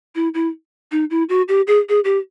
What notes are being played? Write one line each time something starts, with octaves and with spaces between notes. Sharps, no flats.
E4
E4
D#4
E4
F#4
G4
G#4
G#4
G4